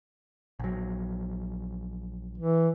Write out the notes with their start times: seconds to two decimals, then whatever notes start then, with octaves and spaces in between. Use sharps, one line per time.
0.60 A#1 F#3
2.38 E3